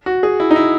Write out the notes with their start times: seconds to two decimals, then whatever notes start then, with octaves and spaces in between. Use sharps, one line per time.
0.06 F#4
0.23 G#4
0.40 E4
0.51 D#4
0.56 E4